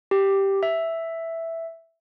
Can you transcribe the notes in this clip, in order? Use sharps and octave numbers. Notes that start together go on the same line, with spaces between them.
G4
E5